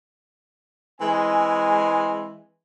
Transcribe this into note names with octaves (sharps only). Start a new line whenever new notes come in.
E3 G#3 C4 G#5